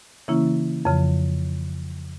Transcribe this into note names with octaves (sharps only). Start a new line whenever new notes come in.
C#3 E3 A#3 C#4 E4
F2 C#3 F3